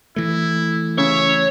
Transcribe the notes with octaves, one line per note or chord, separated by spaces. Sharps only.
E3 A3 E4
C#3 C#5 E5